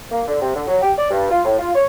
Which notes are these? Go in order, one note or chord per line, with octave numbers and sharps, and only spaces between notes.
A#3
D3
C3
D3
F#3
G4
D5
G2
F4
A2
F4
C#5